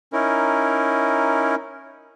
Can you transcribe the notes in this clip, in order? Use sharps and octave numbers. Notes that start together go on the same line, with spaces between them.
C#4 D#4 E4 A#4